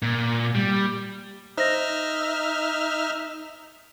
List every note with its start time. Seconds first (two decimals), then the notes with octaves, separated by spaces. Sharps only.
0.02 A#2
0.55 G3
1.57 D#4 C5 E5 F6 A#6